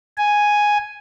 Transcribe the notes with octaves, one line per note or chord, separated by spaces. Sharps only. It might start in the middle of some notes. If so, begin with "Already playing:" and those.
G#5